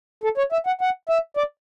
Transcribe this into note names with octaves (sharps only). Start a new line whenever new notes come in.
A4
C#5
E5
F#5
F#5
E5
D5